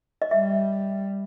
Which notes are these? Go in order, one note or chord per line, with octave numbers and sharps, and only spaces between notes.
D#5
G3 E5